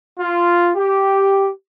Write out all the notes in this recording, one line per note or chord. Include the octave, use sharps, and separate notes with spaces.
F4
G4